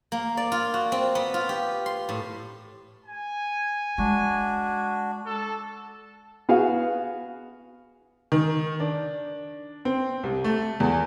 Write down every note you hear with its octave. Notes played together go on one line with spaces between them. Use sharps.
A#3
D5
F4
F#4
C4
B3
F4
G4
C6
A2
G#5
G#3 D4 F#4
A4
B3 F#4 G#4 F5
D#3
D4
C4
C2
A3
E2